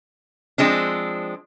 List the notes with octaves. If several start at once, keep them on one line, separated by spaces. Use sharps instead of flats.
F3 G#3 C4 D4